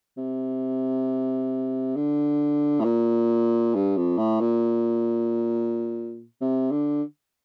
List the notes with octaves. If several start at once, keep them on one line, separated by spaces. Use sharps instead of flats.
C3
D3
A2
A#2
G2
F2
A2
A#2
C3
D3